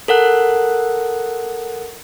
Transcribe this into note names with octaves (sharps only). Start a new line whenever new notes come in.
A4 A#4 F#5 F#6